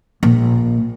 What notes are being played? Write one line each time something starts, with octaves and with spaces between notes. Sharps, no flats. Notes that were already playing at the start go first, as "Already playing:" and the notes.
A#1